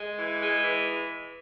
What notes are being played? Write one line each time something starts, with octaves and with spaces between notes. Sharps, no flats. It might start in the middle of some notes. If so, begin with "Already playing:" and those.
Already playing: G#3
E3
G#3
E3